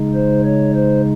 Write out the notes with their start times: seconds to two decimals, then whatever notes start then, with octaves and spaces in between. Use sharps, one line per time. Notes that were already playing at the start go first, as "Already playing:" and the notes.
Already playing: C#3 G#3 D#4
0.14 C5
0.44 C#5
0.74 C5